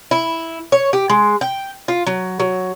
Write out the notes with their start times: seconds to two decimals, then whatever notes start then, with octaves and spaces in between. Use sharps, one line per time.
0.11 E4
0.72 C#5
0.93 G4
1.10 G#3
1.41 G5
1.88 F4
2.07 F#3
2.40 F#3